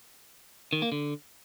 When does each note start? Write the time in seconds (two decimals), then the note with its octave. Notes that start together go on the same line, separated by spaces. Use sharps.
0.73 D#3
0.82 A#3
0.92 D3